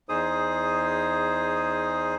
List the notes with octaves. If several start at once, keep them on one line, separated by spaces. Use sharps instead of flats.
E2 D#4 G#4 C5 D#6